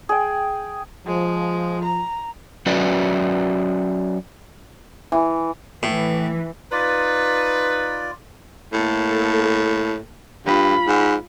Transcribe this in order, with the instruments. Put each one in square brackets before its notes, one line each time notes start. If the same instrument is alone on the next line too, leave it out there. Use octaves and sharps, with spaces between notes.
[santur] G#4 G5
[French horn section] F3 [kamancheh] G#3
[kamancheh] A#5
[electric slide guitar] F#3 C#4 F#4 B4 D5 E5
[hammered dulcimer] E3
[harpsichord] A2 [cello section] E3
[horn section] D#4 B4 [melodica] F4 D5
[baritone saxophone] A2 [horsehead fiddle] A#3 A4
[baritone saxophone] G2 [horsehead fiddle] F4 B5
[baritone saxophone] G#2